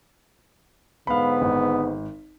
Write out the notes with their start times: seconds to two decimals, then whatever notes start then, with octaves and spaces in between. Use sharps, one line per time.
1.07 G#2 D3 B3 F5 B5
1.42 G#1